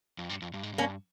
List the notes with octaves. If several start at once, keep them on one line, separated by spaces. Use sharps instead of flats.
F2
G2
F2
G2
G#2
G2
A#3 C#4